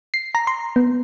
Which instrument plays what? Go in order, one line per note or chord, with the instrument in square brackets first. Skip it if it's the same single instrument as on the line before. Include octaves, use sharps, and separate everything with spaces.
[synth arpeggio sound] C7
A#5
C6
B3